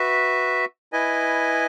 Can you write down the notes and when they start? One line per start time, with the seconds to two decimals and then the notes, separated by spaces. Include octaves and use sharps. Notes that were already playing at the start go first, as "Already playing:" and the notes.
Already playing: F#4 B4 E5
0.93 E4 B4 D#5 G#5